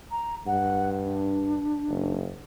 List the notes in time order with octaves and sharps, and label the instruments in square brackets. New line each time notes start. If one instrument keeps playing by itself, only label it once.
[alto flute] A#5
[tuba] G2 [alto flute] F#5
[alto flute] D4
[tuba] F#1